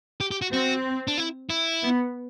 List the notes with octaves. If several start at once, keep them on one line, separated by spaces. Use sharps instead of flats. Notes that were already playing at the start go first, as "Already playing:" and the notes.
G4
G4
F#4
C4 F#4
D4
E4
E4
B3